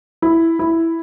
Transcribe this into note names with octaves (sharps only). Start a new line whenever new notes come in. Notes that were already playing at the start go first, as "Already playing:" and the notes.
E4
E4